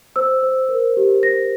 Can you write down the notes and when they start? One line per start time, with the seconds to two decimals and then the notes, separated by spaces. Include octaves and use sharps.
0.16 C5 E6
0.43 C5
0.69 A#4
0.97 G4
1.23 C5 A#6